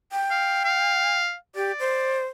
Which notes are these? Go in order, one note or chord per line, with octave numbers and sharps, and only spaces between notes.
G5
F5
F5
G4 D5
C5